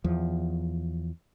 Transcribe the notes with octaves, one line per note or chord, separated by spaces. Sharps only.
E2 F3